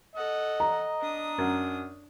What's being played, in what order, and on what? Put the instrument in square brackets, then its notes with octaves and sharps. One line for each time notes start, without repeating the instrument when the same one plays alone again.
[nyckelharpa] A4 F#5 [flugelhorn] D#5
[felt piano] A#5
[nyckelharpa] D4 D#6
[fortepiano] F#2